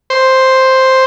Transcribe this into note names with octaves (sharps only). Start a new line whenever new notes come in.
C5